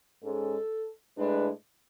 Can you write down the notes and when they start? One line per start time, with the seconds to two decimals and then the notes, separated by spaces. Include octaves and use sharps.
0.22 G#2 G#3 C#4 A4
1.16 A2 G#3 D4 B4